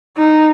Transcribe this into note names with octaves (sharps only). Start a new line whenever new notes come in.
D#4